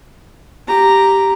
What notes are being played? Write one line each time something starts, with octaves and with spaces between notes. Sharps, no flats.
G4 A#5